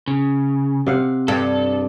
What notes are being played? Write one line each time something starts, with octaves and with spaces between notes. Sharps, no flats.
C#3
C3 F5 F#5
G2 A4